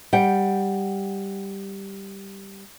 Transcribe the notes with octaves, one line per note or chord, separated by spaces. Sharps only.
G3 F#5 G5